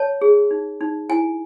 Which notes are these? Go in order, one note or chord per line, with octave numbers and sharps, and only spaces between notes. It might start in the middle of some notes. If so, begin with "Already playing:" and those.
Already playing: C#5 A5
G#4
D#4
D#4
E4 G#5